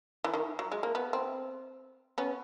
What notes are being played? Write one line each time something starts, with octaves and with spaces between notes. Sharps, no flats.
E3
D#3
F#3
G#3
A#3
B3
C4
B3 C#4